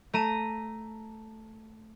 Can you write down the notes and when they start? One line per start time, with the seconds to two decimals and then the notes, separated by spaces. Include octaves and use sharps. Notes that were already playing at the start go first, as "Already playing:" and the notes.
0.13 A3 A#5 D#7 E7